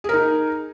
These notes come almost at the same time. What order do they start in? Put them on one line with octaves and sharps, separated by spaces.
G#4 A#4 D#4